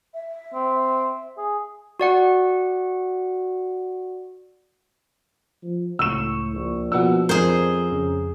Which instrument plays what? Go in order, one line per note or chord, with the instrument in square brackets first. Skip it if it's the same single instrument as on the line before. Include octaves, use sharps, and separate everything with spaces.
[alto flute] E5
[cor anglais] C4
G#4
[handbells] F#4 D5 F#5
[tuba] F3
[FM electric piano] C#2 C#6 [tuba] A2 [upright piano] E6 E7
[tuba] A#1
[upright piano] B2 F#5 E6 [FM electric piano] F3 B3 D4
[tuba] F2 [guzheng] G#4 C5 [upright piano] A#4
[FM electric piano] F2 [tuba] C#3